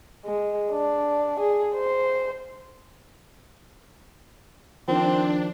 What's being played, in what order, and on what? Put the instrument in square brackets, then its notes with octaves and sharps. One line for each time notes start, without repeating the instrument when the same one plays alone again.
[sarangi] G#3
D4
G#4
C5
[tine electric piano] D#3 F3 [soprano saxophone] C4 [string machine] D4